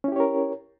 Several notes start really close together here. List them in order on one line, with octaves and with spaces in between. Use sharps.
C#4 E4 G4 C#5 A#4